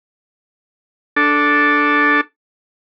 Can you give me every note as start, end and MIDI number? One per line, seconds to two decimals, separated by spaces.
1.16 2.21 62
1.16 2.21 69